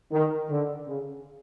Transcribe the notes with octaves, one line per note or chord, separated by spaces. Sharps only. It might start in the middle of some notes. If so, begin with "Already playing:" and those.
D#3
D3
C#3